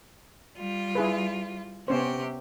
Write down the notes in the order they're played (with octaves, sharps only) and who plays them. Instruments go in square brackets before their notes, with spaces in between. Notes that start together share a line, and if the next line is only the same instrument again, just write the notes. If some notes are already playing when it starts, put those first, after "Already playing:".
[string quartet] G3 F4
[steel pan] E4 G#4 B4
[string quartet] C3 G4 [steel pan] B3 C#4 C5